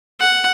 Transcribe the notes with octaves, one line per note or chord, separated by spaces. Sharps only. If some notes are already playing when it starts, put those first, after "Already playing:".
F#5